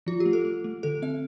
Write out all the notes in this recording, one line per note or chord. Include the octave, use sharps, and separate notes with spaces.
F3 F4
G4
A3
A4
A3
A3
D3 A4
C4 E5